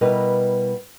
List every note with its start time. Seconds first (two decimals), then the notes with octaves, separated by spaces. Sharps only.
0.01 B2 G3 E4 A#4 B4